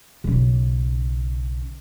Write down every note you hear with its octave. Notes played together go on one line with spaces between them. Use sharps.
B1 C#3